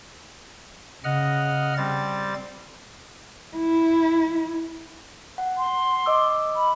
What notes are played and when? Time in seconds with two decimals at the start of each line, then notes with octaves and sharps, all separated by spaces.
1.04 C#3 D#5 F#5 F6
1.77 G3 C4 A6
3.56 E4
5.38 F#5
5.57 C6
6.06 D#5 D6 E6
6.55 B5